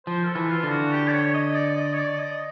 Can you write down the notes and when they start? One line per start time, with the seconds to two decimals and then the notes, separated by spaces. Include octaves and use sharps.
0.06 F3 C5
0.23 A#4
0.28 A4
0.35 E3
0.49 F4
0.63 D3
0.70 F#4
0.92 G4
1.08 D5
1.12 C#5
1.34 D#5
1.55 D5
1.76 D#5
1.93 C#5
1.98 D5
2.19 D#5